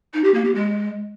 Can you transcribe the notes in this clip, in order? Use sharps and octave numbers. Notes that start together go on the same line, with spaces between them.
D#4
G4
A#3
G4
G#3